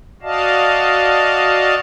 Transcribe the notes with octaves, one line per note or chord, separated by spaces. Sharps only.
F#4 D5 D#5 F5 A5